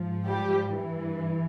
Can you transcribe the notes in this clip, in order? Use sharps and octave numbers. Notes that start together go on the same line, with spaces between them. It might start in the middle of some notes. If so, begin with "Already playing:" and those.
Already playing: G#2 F3
G3 G4
G2 E3